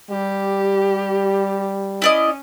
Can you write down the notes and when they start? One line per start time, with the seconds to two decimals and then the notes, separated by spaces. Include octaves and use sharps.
0.11 G3 G4
2.02 C#4 E4 D5 D#5